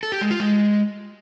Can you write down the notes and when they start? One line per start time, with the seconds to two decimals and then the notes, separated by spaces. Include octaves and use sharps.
0.03 A4
0.12 G4
0.21 G#3
0.31 F4
0.40 G#3